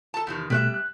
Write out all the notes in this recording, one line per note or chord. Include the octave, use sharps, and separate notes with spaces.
A4 A5
E2 C3 D#3
B2 G3 A3 C#5 E5 F#6
F#6